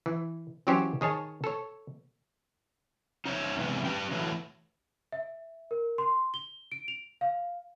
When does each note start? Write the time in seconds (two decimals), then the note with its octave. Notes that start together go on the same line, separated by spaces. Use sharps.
0.06 E3
0.67 E3 F#3 C#4 G4 C5 C#5
1.01 D#3 G#4 C#5 A5
1.44 A4 C#5
3.25 D#4 C5 C#5 E5
3.57 E2 G#2 C3 E3 B3
3.85 D4 G4 B4 G5
4.11 E3 F#3 A3
5.12 E5
5.71 A#4
5.98 C6
6.34 G7
6.72 D7
6.88 F7
7.21 F5